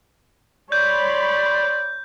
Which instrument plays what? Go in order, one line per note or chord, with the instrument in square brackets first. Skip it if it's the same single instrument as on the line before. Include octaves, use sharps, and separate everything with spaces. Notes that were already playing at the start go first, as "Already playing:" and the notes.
[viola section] C#5 B5 C6 [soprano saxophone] D5 [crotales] G6